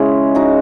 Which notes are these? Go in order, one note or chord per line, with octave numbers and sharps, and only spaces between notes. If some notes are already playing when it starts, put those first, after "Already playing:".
Already playing: C#3 G#3 C#4 E4
D#4 F#4